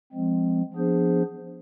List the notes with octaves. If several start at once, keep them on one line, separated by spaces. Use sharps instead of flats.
F3 G#3 C4
F3 B3 D4 G#4 C5